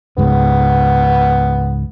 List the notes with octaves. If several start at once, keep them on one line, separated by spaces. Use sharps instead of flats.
C#2 G#2 C#3 B3